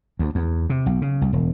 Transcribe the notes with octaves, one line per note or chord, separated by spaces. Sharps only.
D2
E2
C3
B1
C#3
C2
E1